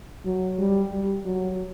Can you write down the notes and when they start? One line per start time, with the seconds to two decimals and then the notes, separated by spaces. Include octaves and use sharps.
0.25 F#3
0.59 G3
0.92 G3
1.25 F#3